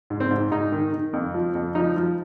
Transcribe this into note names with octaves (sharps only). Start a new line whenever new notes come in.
G#2
C4
G#2
G#2 D#4
D#3
D#3
F2
F3
F2
F3 D#4
F3